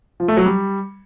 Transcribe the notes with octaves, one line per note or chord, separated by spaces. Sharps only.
F3
A3
F#3
G3